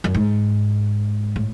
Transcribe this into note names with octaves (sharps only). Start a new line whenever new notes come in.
F#2
G#2
A2